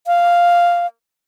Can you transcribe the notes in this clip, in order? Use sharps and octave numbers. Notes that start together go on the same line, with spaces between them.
F5